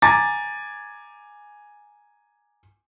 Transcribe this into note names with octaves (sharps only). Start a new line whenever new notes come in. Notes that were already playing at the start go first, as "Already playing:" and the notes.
G#5 A#5 D6 A6